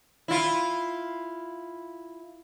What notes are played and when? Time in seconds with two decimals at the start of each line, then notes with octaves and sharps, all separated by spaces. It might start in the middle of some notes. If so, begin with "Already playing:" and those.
0.28 E4 F4